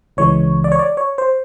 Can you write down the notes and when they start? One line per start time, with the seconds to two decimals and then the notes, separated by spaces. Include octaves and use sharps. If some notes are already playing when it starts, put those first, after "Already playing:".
0.17 C#2 C#3 E3 G#3 C#5
0.64 D5
0.72 C#5
0.79 D5
0.97 C#5
1.18 C5